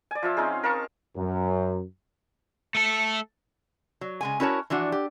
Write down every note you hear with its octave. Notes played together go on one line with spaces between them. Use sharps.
D5 G#5
F3 F4 E5
C4 C#4 D#4 G#4
A#4 F5 A5 C#6
F#2
A3 A4
F#3
C#3 G#3 G#5
C#4 E4 F#4 A#4 C#5 A5
E3 F3 D4 F#4
G4